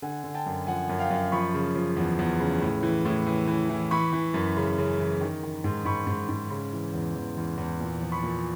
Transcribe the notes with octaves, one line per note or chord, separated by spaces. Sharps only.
D3 F#5 G#5
D3
G5 A5
F#2
F3 F#5 G#5
F#2
F5 G5
F#2
F3 B5 C#6
C#3
F3
E2
E2
C#3
A2
E3
A2
E3
E3
E3
E3 B5 C#6
E3
F#2
C#3
C#3
E3
D#3
D#3
G#2
G#2 B5 C#6
G#2
G#2
C#3
E3
E2
E2
E2
E2
A#2
F3
B5 C#6
A#2